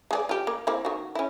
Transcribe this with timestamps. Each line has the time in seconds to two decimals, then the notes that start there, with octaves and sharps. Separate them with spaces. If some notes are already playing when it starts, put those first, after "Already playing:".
0.11 G#3 G#4 D5
0.29 F4 G4
0.47 A#3
0.67 A#3 C4 E4
0.85 D#3 F#4
1.15 C#4 E4